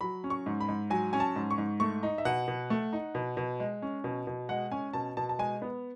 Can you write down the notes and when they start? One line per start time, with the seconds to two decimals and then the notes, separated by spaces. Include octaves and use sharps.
0.01 F#3 B5
0.24 C#4
0.30 C#6
0.46 G#2
0.61 B5
0.69 G#2
0.90 F#3 G#5
1.13 C#4 G#5
1.20 A5
1.36 G#2
1.51 C#6
1.58 G#2
1.80 A3 C#6
2.03 D#4
2.18 E5
2.25 B2 F#5
2.48 B2
2.70 A3
2.93 D#4
3.15 B2
3.37 B2
3.60 G#3
3.82 C#4
4.04 B2
4.27 B2
4.49 G#3 F#5
4.71 C#4 G#5
4.93 B2 A5
5.17 B2 A5
5.29 A5
5.39 G#3 G#5
5.62 B3